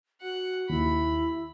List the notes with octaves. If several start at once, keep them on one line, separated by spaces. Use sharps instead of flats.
F#4 F#5
D#2 E4 B5